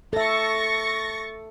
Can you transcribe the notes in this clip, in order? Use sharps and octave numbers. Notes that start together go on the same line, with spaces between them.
A4 E5 C#6 A6 A#6